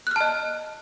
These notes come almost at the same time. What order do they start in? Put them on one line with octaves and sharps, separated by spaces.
F#6 F6 A5 D#5